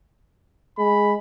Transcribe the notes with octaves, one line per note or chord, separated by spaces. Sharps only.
G#3 B5